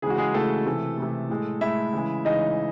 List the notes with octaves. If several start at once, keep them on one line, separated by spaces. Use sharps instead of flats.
C#3 E3 G#3 G#4
F#4
G#3 G#4
C#3 E3 G#3 A3 A4
C3 E3 A3
C3 E3 A3
A2 G#3
A2 G#3 E4 E5
C#3 E3 G#3
C#3 E3 G#3 D#4 D#5